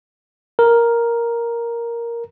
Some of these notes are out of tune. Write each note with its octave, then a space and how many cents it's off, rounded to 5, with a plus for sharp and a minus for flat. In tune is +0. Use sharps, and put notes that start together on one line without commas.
A#4 +5